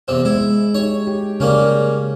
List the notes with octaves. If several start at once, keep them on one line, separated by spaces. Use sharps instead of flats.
E2 C3 C4
G#3 E4
D#4 G4 C#5
G4
C#3 G3 A#3 C#4